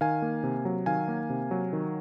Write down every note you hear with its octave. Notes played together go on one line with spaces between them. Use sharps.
D#3 F5 G#5
A#3
C3
F#3
D#3 F5 G#5
A#3
C3
F#3
D#3